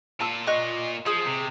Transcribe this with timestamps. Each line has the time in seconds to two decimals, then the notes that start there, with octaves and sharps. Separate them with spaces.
0.21 A#2 F4 A5 E6
0.47 D#5 C#6 F#6
1.06 F3 G#4
1.26 C3